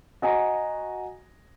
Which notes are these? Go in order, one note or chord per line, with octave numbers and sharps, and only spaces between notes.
F#4 D#5 G#5 A#5